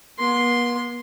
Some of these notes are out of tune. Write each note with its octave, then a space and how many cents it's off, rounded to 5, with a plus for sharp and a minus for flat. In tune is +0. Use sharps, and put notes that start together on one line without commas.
B3 -45 C6 +0